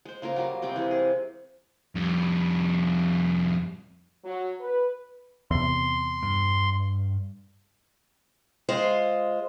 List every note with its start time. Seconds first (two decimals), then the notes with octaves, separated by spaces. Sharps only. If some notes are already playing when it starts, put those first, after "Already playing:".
0.05 G#3 C5
0.22 C#3 A#3 F4 A#4
0.36 F#3 G3 F4 A#4
0.62 C3 G3 G#3 G5
0.76 E3 G#3 C4
0.91 G#4
1.95 F2 G3
4.25 F#3
4.60 B4
5.51 E2 C3 C6
6.23 G2
8.69 G#3 F4 C5